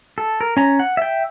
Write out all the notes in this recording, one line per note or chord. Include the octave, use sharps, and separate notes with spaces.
A4
A#4
C#4 A#5
F#5
E5 G5